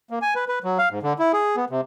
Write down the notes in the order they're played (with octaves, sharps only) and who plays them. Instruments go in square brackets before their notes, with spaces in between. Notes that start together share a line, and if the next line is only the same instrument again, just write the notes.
[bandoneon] A#3
G#5
B4
B4
F#3
F5
G#2
D3
E4
G#4
B3
C3